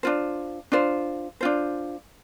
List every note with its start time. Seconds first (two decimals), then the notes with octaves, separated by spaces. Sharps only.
0.03 D4 F4 C5
0.72 D4 F4 C5
1.41 D4 F4 C5